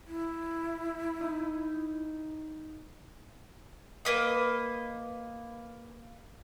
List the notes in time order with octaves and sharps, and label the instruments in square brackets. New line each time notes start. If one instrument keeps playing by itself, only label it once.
[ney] E4
[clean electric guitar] D#4
[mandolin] A#3 B4 D#5